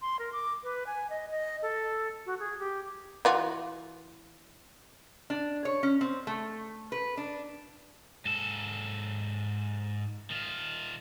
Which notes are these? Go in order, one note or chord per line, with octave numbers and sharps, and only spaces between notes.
C6
A#4
D6
B4
G#5
D#5
D#5
A4
F#4
G#4
G4
E3 F4 F#4
D4
C#5
C#4
C4
A3
B4
D4
G#2 A4
D#3 F4